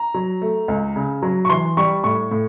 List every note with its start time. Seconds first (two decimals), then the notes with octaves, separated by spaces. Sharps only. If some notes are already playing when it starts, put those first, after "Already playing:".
Already playing: A#5
0.14 F#3
0.42 A3
0.68 C#2
0.96 C#3
1.22 F#3
1.45 C#6
1.50 E3 C6
1.77 G3 C#6
2.04 A2 C#6
2.31 A2